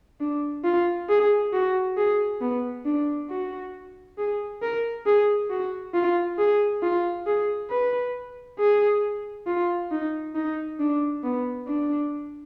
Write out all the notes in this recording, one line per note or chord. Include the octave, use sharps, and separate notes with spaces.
D4
F4
G#4
F#4
G#4
B3
D4
F#4
G#4
A#4
G#4
F#4
F4
G#4
F4
G#4
B4
G#4
F4
D#4
D#4
D4
B3
D4